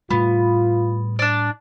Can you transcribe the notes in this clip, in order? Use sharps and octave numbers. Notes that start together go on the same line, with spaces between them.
A2 G3 B3 F4
D4 D5